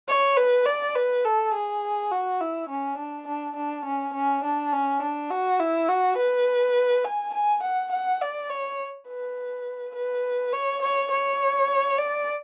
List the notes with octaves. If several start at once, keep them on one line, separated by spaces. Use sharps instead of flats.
C#5
B4
D5
B4
A4
G#4
F#4
E4
C#4
D4
D4
D4
C#4
C#4
D4
C#4
D4
F#4
E4
F#4
B4
G#5
G#5
F#5
F#5
D5
C#5
B4
B4
C#5
C#5
C#5
D5